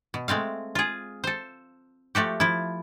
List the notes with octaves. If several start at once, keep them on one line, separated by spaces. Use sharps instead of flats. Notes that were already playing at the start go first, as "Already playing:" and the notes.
B2
G#3 A3 C4 F5
F4 G#4
A4 C5
F3 A3 F#4 G4
F3 E4